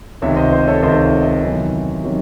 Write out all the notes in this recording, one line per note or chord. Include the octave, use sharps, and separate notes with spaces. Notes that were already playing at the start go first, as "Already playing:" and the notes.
C#2 C3 D#3 C#5 E5
C5 D#5
C5
A4 C#5
C#2 C3 D#3 C5 D#5
C#5 E5
C#5 E5
D#5
C#5 E5
E2 C3 D#3 F#3 C#4
C3 D#3 F#3 C#4